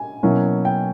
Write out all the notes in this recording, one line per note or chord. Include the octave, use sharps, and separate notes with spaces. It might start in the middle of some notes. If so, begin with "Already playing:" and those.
Already playing: G#5
B2 F#3 A#3 C#4 E4
G5